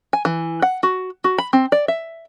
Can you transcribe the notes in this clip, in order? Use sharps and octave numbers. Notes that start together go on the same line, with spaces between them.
G#5
E3
F#5
F#4
F#4
B5
C4
D5
E5